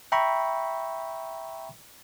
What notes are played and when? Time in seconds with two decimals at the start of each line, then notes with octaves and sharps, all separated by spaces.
0.12 E5 G5 A#5 B5 C#6